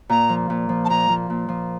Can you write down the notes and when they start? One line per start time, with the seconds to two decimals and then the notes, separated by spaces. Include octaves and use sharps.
0.09 A#2 A#5
0.29 F3
0.50 A#2
0.69 F3
0.85 A5
0.90 A#2 A#5
1.09 F3
1.30 A#2
1.49 F3